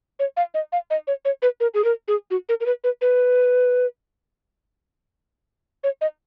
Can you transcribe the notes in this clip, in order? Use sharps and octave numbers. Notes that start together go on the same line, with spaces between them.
C#5
F5
D#5
F5
D#5
C#5
C#5
B4
A#4
G#4
A#4
G#4
F#4
A#4
A#4
B4
B4
B4
C#5
D#5